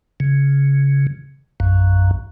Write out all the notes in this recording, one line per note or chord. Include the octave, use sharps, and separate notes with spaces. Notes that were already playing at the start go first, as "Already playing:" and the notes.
C#3
A#1 F#2